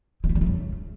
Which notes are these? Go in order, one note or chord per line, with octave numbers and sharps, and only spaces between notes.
G#3
A3
G3
A3
C#3